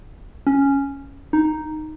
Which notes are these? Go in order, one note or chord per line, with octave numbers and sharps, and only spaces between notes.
C#4
D#4